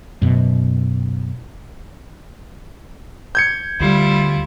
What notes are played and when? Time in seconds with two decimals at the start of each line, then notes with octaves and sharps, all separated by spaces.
0.22 F#2 B2
3.35 G6 G#6 C#7
3.80 D2 G3 E4 F4